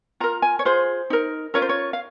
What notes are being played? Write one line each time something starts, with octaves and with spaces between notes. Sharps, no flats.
F4 A#4 A#5
G#5
C#5
F4 G#4 C5
D#4 A#4
C#4 F4 A#4 C#5
C5
C#5
F5